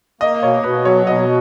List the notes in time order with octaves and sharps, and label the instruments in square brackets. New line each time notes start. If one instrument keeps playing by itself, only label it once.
[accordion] A#3 [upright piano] D#5
[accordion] B2 [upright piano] C#5
[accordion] B2 [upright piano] B4
[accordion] F#3 [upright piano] C#5
[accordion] B2 [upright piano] D#5